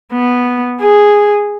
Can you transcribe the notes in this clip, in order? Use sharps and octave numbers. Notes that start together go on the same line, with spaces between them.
B3
G#4